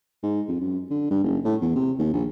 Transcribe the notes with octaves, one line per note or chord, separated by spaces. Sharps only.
G#2
F2
F#2
D3
G2
F#1
A2
E2
C3
D#2
A#1